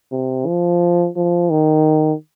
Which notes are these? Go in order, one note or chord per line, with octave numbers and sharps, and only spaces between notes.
C3
F3
F3
D#3